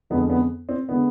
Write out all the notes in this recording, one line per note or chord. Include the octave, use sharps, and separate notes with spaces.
F2 D3 G#3 B3
B3
C4
D3 G#3 B3